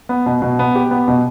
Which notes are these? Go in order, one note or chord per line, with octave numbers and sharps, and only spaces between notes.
B3
B2
B2
B3
G4
B3
B2